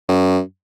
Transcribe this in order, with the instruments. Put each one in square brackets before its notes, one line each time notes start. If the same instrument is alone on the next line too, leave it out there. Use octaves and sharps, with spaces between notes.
[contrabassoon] F#2